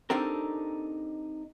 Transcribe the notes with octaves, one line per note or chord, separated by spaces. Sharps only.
C4 D4 D#4 G4 A4 A#4